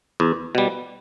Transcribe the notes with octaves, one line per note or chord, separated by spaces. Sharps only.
E2
B2 G3